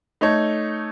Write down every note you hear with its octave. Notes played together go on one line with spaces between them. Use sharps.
A3 D#4 A4 C#5